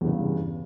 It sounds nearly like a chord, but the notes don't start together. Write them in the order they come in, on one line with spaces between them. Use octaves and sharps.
E2 G2 C#3